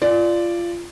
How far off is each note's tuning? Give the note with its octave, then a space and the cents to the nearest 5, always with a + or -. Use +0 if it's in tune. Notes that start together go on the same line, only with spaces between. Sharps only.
F4 -20 D5 +0